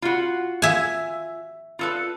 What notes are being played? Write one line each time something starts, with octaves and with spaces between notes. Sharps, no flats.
F4 F#4
E5 G#5
F4 A4 B4